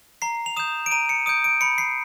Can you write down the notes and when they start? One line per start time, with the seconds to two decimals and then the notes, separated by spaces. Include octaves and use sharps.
0.22 A#5 C7
0.46 F7
0.57 D#6 G6 E7
0.86 D7
0.91 A#5 D#7
1.09 C#7
1.26 D#6 G6 D7
1.44 D7
1.61 B5 C#7
1.78 C7